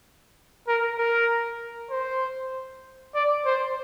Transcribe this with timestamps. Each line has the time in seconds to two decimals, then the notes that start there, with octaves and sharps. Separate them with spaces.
0.68 A#4
0.99 A#4
1.91 C5
3.15 D5
3.46 C5